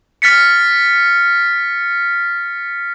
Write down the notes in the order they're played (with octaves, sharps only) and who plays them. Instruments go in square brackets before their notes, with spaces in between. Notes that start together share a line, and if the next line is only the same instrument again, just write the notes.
[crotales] F6 A6 B6 C#7